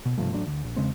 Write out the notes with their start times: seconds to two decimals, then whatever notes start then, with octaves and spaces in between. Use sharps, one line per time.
0.05 B2
0.18 G2 C3 F3 A3
0.32 A1 F#3 A3 D4
0.47 D2
0.64 A#1
0.76 E2 C#3 G#3 C4